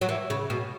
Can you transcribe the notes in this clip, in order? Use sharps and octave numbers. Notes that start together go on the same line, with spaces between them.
F#3
E3
C#3
B2